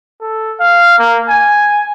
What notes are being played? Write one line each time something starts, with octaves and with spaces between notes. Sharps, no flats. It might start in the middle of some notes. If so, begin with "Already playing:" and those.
A4
F5
A#3
G#5